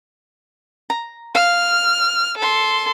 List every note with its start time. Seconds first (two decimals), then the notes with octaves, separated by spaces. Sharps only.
0.90 A#5
1.35 F5 F6
2.38 A4 C6